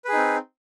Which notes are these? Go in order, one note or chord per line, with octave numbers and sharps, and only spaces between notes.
C4 D#4 G#4 B4